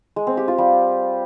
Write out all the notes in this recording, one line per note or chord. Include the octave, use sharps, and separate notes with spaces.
G#3
C4
G4
F4
G3